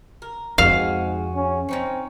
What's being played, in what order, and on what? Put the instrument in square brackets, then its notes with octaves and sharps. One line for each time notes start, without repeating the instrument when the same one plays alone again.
[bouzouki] A#4
[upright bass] F2 [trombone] G#2 [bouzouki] F#4 G#4 [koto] F5
[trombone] C#4
[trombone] C4 [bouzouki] C#4 D#4 C#5